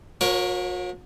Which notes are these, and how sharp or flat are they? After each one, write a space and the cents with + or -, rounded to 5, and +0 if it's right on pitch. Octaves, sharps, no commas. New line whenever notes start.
F#3 -45 A#4 +15 C#5 +0